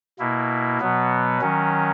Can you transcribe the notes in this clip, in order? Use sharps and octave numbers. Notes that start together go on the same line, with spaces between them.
B2 A#3 E4
B2 F#3 B3
D#3 F#3 C#4